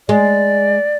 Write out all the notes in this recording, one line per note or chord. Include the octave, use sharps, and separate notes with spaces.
G#3 D5